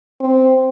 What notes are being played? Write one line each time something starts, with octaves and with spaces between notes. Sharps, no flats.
C4